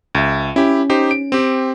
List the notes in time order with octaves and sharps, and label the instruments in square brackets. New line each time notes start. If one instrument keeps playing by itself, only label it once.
[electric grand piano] C#2 E5
[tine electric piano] C#4 [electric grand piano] E4 G4
[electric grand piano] D#4 G4 C5
D7
C4 G4